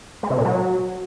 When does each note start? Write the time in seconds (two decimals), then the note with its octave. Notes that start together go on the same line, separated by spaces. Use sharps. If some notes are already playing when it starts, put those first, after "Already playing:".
0.23 G#3
0.30 C3
0.38 A#2
0.45 F#3